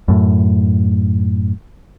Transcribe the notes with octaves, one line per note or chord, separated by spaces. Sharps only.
F#2 A2